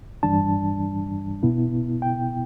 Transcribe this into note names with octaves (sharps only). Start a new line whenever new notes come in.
G2 E3 G3 D4 A5
B2 B3 E4
G5